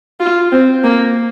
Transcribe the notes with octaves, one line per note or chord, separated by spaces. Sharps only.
F4
C4
A#3